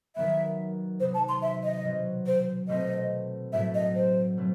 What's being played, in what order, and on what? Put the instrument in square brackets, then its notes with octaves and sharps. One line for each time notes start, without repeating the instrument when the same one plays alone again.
[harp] D#3 F#3 B3 [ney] E5
[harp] C3 F#3 B3 D#4 [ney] C5
[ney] A5
C6
E5
D#5
[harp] B2 F#3 C4
[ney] C5
[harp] B2 A3 C4 [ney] D#5
[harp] A2 F#3 A3 [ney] E5
[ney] D#5
C5
[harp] B2 F#3 A3 C4